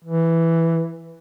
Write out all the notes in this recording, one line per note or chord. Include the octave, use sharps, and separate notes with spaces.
E3